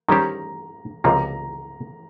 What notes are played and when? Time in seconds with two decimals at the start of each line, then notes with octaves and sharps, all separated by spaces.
0.08 D#3 G3 C#4 G4 C5 A#5
1.04 C#2 C3 F3 A#3 A#5